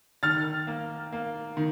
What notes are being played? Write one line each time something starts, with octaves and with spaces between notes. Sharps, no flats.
D#3 F6 A6
A#3
A#3
D#3